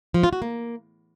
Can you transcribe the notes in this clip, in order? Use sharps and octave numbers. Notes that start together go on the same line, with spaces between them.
F3
F4
F#4
A#3